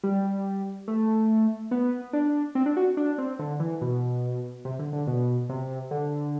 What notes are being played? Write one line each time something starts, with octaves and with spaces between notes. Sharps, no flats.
G3
A3
B3
D4
C4
D4
F#4
D4
C4
D3
E3
B2
C3
D3
D3
B2
C3
D3